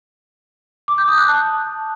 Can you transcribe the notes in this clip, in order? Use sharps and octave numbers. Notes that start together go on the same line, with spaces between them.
D6
G6
D#6
F#6
A5